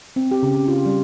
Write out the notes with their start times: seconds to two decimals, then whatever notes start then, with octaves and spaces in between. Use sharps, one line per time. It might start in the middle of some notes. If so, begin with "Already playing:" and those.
0.16 C4
0.31 G4
0.43 C#3
0.68 F4
0.86 G3